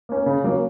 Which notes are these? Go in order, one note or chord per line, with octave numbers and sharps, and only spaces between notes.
A#3 C#4
C#3
F#3 A#3 C#4